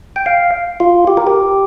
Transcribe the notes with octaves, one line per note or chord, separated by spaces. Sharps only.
G5
F5
F4
G4
A#4
G4